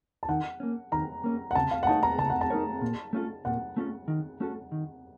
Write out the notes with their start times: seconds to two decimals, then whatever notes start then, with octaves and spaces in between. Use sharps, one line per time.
0.23 A5
0.28 D#3 F#5
0.60 A#3 C#4
0.92 D#3 A#5
1.24 A#3 C#4
1.51 F#5
1.55 C#3 A5
1.71 F5
1.83 F#5
1.87 A3 D#4 A#4 C#5 A5
2.03 A#5
2.18 C#3 A5
2.30 F#5
2.41 A5
2.50 A3 D#4 A#4 C#5
2.81 A#2
3.13 A3 C#4 F4 A4
3.45 A#2 F#5
3.77 A3 C#4 F4 A4
4.08 D#3
4.40 A3 C#4 F#4 A4
4.72 D#3